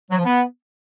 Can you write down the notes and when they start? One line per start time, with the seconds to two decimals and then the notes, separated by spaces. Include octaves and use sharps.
0.11 F#3
0.18 F3
0.25 B3